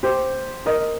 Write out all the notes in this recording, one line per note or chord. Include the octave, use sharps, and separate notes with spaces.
G4 C5
A#4 D#5